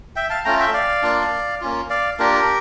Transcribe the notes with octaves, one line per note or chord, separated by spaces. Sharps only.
E5 G5
F5 A5
A3 C#4 F4 G5 A#5
E5 G5
D5 F5
A#3 D4 F4
A#3 C#4 F4
D5 F5
A#3 D4 F4 G4 A#4